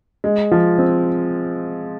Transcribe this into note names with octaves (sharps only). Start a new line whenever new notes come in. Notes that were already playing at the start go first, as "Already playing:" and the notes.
G#3
F3
C4